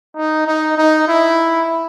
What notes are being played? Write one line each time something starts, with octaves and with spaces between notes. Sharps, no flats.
D#4
D#4
D#4
E4